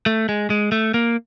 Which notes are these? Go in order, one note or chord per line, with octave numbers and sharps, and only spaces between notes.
A3
G#3
G#3
A3
A#3